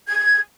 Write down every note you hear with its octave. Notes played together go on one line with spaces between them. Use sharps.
G#6